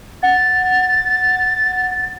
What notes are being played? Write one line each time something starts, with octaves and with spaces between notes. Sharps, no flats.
F#5 A6